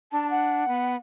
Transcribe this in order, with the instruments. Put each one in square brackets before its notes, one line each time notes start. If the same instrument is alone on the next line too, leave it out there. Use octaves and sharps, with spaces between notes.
[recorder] D4 [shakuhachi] A5
[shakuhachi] F#5
[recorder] B3